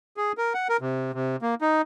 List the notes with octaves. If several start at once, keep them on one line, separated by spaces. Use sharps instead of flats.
G#4
A#4
F#5
A#4
C3
C3
A#3
D#4